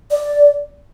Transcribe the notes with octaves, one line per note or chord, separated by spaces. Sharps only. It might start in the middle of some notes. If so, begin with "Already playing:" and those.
D5